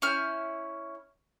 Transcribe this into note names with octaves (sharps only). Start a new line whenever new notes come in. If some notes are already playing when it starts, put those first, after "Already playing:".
C#4 E4 F6 G6